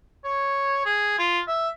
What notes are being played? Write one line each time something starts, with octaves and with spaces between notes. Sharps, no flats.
C#5
G#4
F4
E5